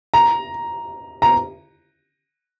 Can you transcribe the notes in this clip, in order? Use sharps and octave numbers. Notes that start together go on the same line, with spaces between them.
A#5
A#5